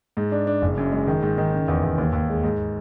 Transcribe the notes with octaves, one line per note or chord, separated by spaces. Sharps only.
G#2
D4
D4
F#1
F#2
G#3
D#3
G#2
D#3
C#3
E2
E2
D#2
D#2
G#3
G#2